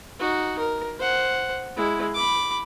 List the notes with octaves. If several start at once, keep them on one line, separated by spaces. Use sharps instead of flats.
D#4 F#4
A#4
C5 F#5
G#3 E4
B5 D6